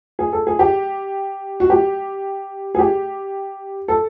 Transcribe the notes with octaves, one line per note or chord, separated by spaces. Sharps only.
G#4
A4
G#4
G4
F#4
G4
G#4
G4
A4